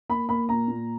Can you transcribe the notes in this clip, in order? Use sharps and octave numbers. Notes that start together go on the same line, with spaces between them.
A#3 B5
A#3 B5
A#2 A#5
A#2